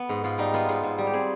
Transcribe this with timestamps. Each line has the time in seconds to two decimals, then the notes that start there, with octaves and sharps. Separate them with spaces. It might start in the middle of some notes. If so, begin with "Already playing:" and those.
Already playing: B3
0.09 G#2
0.24 G#2 F4
0.38 G3 D#4
0.54 B3 F4
0.69 G#2 F4
0.83 G#2
0.98 G3
1.07 G4
1.13 C4 G#4